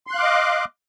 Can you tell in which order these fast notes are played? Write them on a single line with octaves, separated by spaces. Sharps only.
C6 F#6 F5 D6 D#5